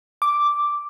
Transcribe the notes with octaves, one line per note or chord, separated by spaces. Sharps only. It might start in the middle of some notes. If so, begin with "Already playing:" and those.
D6